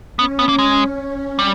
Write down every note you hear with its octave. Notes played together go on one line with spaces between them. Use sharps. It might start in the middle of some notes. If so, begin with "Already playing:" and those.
B3 C#4
B3
A#3
G#3 C#4
G3